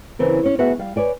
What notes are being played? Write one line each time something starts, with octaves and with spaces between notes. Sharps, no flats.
C#3 E3 C4 A#4
C#4 C#5
D2 B3 F#4 G#4 E5 F#5
G3 F5
B4 C#5 D5 G#5